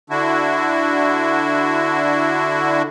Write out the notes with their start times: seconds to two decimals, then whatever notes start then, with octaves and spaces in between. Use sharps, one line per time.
0.10 D3 D4 E4 F#4